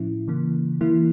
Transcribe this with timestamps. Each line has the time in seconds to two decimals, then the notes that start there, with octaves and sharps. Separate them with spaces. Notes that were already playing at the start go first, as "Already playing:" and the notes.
Already playing: A2 F3 C#4 E4
0.28 C#3 E3 A#3
0.81 E3 A#3 E4